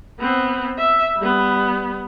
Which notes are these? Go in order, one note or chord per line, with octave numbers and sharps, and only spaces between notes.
B3 C4
E5
G3 B3